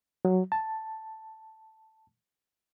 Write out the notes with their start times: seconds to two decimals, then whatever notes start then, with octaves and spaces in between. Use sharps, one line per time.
0.25 F#3
0.52 A5